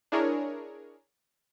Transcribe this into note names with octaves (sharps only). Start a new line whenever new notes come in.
D4 E4 G#4 A#4 C#5